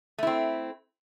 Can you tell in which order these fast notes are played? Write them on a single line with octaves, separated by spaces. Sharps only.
A3 E4 C4